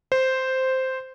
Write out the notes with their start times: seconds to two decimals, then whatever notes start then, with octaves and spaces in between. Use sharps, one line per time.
0.12 C5